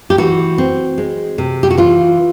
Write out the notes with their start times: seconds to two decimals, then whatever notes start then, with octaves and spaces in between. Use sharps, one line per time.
0.10 G4
0.18 E3 F#4
0.58 C4
0.98 G#3
1.38 C3
1.63 G4
1.70 F#4
1.77 E3 F4